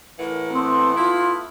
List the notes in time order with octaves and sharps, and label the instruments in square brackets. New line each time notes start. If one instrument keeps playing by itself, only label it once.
[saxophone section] A2 E3 F#5 [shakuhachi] A#4
[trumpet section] A3 B3 C6 [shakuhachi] C4
[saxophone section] E4 [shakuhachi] F4